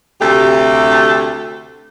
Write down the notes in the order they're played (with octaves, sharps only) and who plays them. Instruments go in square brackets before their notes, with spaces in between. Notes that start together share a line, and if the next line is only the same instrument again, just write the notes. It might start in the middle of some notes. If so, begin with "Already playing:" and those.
[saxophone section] D2 C3 A3 G4